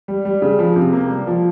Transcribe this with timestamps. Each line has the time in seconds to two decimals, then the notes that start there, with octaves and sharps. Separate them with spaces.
0.08 G3
0.25 G3
0.42 C#3
0.59 F3
0.76 C3
0.93 A#3
1.10 G3
1.27 F3